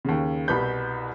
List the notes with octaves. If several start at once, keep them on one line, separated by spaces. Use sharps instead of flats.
D#2 C#3
C2 B2 B4 B5 G6